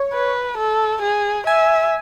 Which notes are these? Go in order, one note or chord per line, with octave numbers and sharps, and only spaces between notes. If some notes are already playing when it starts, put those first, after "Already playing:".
Already playing: C#5
B4
A4
G#4
E5 G#5